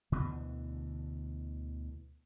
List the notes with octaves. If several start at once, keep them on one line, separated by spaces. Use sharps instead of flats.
D2 B2 D3 E3